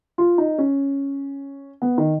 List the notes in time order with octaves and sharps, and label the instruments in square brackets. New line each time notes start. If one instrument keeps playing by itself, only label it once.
[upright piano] F4
D#4
C#4
B3
D#3